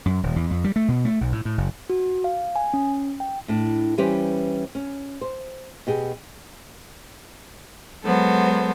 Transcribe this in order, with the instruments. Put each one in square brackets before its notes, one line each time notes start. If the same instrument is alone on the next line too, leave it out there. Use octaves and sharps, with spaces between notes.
[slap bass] F#2
D#1
E2
F2
G3
A3
B2
A3
B1
A2
A2
F#1
[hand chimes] F#4
F5
G#5
C#4
G5
[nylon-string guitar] A2 D4
E3 G3 C#4 G4 B4 C5
C#4
C5
B2 G4 G#4
[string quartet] F#3 G#3 B3 A4 C5